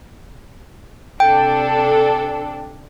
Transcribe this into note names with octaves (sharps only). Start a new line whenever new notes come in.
C3 D4 A4 G5